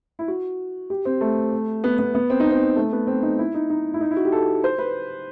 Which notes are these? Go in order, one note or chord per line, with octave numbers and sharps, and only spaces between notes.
E4
F#4
G4
C4
A3
B3
B3
B3
C4
D#4
C4
A3
B3
C4
D#4
E4
D#4
D#4
E4
D#4
E4
F#4
G4
A4
C5
B4